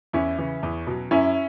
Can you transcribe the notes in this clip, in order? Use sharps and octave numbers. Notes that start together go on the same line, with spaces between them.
E2 C#4 E4
C#3 E3
E2
B2 F#3
F#2 C#4 E4